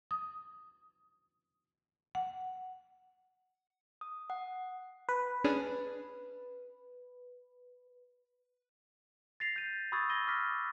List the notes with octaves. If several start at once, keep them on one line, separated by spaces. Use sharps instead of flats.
D#6
F#5
D#6
F#5
B4
C#4 D4 G#4
A6 A#6 C7 F7
G6 D#7
B5 C#6 D#6 E6 G#6 A6
B5 G#6 A#6 D#7 G7
D6 E6 F6 A#6 B6